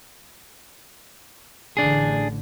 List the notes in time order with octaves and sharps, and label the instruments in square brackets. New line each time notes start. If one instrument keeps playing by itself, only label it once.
[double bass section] A1 D3 [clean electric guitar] D4 G#4